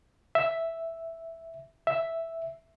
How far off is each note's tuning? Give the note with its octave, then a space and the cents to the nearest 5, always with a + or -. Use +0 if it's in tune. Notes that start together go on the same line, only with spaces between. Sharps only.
E5 +0
E5 +0